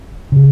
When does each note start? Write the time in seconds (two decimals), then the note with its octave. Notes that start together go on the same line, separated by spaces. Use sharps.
0.32 C#3